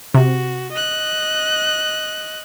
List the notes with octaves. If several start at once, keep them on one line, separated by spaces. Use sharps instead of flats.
C3 F#4
D#5 F#6